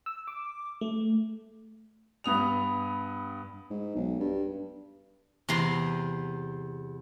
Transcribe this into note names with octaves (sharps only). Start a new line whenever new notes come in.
E6
D6
A3
G2 B3 D#6 F7
G#2
B1
G2
E2 C3 A#5 C6